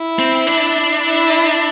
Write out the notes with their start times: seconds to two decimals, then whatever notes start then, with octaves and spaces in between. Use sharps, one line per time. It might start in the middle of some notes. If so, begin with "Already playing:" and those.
Already playing: E4
0.19 C4
0.47 D4
1.02 E4